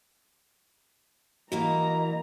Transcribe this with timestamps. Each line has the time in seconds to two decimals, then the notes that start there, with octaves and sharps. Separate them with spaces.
1.52 E3 A#3 F#4 D#5 A#5